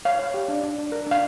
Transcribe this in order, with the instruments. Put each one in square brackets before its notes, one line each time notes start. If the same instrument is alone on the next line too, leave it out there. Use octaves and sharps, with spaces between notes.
[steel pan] C#5 F5
C#5
G4
D4
D4
D4
A#4
D4 F5